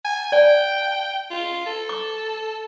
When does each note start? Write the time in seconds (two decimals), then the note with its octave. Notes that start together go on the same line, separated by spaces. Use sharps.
0.04 G#5
0.32 D5 G5
1.30 F4
1.66 A4
1.89 D6